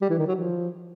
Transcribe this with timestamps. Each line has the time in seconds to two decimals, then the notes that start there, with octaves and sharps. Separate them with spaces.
0.01 G3
0.10 E3
0.18 D#3
0.27 F#3
0.35 F3